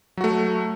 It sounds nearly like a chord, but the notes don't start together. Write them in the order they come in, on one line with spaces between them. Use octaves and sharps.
F#3 F#4 A3